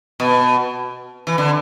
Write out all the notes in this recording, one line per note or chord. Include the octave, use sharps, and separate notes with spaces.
B2
E3
D3